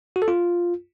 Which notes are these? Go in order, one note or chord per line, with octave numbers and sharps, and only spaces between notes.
F#4
A4
F4